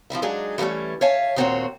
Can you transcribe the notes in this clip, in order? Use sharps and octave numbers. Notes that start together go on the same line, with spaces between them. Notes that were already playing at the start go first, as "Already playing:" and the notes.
F3 C4 E4 E5
F#3 G#3 D4 D#4 G#4
E3 F#3 G3 A3 C#4
C#5 E5 F5 G#5 A5
D#2 A#2 C4 D4 F#4 C#5